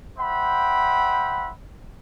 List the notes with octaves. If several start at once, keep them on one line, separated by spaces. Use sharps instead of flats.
C5 E5 F#5 G5 B5